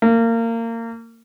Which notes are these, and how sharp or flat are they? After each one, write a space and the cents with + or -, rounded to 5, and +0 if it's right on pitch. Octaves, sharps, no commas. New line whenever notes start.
A#3 -25